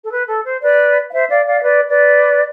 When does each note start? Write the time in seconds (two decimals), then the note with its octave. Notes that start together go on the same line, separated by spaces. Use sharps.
0.04 A4
0.12 B4
0.29 A4
0.45 C5
0.63 B4 D5
1.08 F5
1.13 C5 E5
1.30 D5 F5
1.46 D5 F5
1.58 E5
1.63 B4 D5
1.88 B4 D5